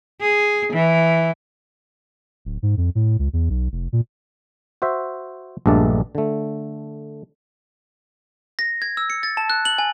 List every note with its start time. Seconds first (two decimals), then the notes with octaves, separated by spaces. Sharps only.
0.21 G#4
0.73 E3
2.45 D1
2.62 G#2
2.77 F2
2.95 A2
3.19 C#2
3.33 E2
3.49 B1
3.72 F1
3.93 A#2
4.82 F#4 C5 E5
5.66 A#1 G2 G#3 A3 D4 D5
6.15 D3 A3
8.59 A#6
8.82 G#6
8.97 E6
9.10 C#7
9.23 A6
9.37 A5
9.50 F#6
9.65 F#7
9.78 G#5